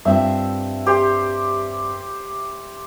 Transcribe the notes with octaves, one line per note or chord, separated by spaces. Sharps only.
G2 C4 F4 E5
G4 C5